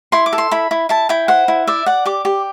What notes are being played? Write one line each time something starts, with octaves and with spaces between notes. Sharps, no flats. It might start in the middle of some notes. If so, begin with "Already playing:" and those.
E4 C6
D6
A4
C6
E4 B5
E4
E4 A5
E4 G5
C5 F#5
E4
D5 E5
D5 F#5
G4 D6
G4